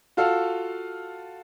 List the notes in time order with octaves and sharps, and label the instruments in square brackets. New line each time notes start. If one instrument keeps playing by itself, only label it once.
[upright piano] F4 F#4 A4 F5